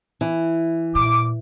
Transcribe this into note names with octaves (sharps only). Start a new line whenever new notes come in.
E3
A#2 D6